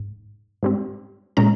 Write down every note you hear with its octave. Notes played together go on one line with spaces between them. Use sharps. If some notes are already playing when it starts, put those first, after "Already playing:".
Already playing: G#2
G#2 G3 C4
A#2 G#3 C#4 A#5